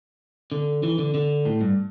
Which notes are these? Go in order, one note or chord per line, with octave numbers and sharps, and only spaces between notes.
D3
E3
D3
D3
A2
G2